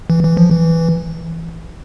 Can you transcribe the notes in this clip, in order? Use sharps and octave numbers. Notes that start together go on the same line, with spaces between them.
E3
E3
F3
E3